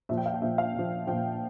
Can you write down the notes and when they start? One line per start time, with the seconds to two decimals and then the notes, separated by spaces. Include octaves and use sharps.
0.09 A#2 F3 E5
0.17 G5
0.26 F5
0.34 G5
0.42 A#2 F3 E5
0.58 F5
0.75 A#2 F3
1.07 A#2 F3 G5